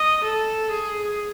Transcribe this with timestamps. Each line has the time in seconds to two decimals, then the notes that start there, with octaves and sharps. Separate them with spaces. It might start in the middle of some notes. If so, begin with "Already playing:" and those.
Already playing: D#5
0.24 A4
0.71 G#4